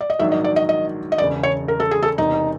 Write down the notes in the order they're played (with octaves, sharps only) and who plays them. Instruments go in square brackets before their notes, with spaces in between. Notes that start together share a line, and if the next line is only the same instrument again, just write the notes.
[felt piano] D5
D#5
[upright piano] A#1 G#2 D#3 F#3 [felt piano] E5
[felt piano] D#5
D5
D#5
D#5
D#5
[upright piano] E1 [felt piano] D5
[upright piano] E2 C#3
[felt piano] C#5
A#4
A4
G#4
A4
[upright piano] E1 E2 C3 [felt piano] D#4